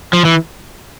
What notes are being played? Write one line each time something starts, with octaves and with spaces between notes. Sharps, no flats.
F3
E3